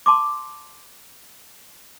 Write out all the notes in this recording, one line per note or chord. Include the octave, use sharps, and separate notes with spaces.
A5 C6 D6